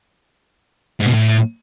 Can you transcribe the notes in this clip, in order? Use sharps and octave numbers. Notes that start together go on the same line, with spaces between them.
G#2
B2
A2